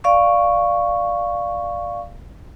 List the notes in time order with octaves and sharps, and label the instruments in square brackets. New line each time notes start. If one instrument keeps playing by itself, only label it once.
[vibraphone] D5 F5 C#6